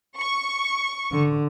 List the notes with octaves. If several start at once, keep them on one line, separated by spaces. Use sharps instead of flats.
C#6
D3